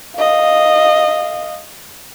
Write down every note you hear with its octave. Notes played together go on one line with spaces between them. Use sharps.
D#5 F5